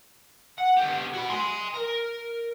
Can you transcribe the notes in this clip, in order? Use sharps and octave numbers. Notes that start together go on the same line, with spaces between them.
F#5
B3 G4
F#4 B5
G#5 C6
A#4